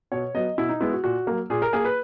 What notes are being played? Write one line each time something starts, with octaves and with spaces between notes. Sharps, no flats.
B2 C#5
F#3 B3 D#5
B2 E4
D#4
G#3 B3 E4
F#4
A#2 F#4
F#3 A#3
A#2 G#4
A#4
A#3 G#4
B4